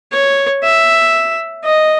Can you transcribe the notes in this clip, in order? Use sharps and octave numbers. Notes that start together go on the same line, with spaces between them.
C#5
E5
D#5